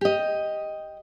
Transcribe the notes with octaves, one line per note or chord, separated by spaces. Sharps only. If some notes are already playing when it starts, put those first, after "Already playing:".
G4 D#5